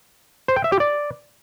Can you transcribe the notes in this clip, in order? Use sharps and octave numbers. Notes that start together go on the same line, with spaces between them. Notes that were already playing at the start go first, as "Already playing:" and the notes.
C5
G5
E5
G4
D5